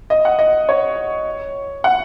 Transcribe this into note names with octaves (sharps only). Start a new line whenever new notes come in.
D#5
F#5
D#5
C#5
F#5